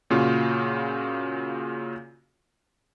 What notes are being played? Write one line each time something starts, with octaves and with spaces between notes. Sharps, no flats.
A#2 C#3 F4 F#4